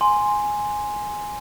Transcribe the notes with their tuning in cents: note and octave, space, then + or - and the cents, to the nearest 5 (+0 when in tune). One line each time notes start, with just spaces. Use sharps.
G#5 +0 C6 +0